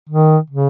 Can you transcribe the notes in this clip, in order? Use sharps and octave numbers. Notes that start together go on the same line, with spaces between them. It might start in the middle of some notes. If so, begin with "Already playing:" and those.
D#3
C#3